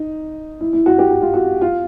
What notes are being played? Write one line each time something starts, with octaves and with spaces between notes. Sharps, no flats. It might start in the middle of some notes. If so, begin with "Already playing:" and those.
Already playing: D#4
E4
E4
F#4
G4
F#4
F4
F#4
F4